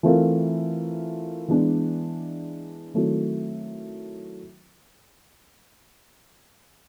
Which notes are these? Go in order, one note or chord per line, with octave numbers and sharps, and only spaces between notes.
E3 A3 C4 F4 A#4
E3 G#3 B3 D4
D#3 F#3 A3 C4 E4